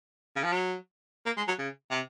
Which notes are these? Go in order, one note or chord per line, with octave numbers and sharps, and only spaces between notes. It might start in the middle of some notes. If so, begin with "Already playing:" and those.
C#3
F3
F#3
A#3
G#3
F#3
C#3
C3